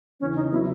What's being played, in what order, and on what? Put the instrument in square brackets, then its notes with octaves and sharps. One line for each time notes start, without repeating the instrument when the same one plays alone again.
[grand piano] E2 C#3 E3 [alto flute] C#4
[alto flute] D#4
[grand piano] C#3 F#3 B3 [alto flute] E4